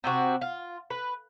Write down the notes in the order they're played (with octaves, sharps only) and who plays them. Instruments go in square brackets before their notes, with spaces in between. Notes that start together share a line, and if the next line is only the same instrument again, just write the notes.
[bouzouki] C3 C4 F#4
F4
B4